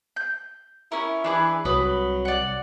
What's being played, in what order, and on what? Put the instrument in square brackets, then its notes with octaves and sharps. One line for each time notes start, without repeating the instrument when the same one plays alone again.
[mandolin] G6
[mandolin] C#4 A#4 [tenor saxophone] E4
[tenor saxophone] E3 [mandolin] D4 G#4 B4
[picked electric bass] C2 [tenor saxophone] F#3 [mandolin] B4 D#6
[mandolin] D5 F#5